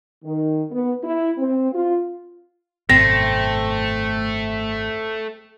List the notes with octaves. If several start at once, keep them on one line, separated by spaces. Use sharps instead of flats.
D#3
B3
E4
C4
F4
G#1 F#2 B2 A3 C4 A#6